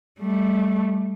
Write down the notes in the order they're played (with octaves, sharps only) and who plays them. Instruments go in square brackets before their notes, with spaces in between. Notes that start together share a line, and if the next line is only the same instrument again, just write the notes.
[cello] G3 A3